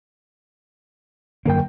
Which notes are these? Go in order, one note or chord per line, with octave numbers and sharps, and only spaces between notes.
F#2 D3 A#3 A#4 G5